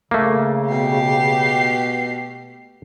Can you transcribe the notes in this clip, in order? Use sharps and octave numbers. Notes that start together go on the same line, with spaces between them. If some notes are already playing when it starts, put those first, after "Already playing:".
C#3 A3 A#3
B2 G4 C7